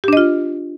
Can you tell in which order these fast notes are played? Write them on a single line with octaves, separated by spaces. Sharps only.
G4 D4 D#5 F4